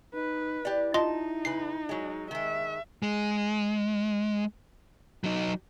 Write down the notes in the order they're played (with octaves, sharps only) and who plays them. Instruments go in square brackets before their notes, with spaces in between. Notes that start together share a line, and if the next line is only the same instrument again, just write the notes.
[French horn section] D#4 [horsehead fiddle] B4
[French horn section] E4 [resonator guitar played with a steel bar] G4 D5
[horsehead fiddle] D#4 [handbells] F4 D#5 C6 [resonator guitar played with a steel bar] A5
[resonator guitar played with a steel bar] C#3 B4 [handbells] C7
[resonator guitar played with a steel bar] F#3 G#3
[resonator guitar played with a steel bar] D#3 G#3 [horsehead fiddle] E5
[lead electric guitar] G#3
F#3 D#4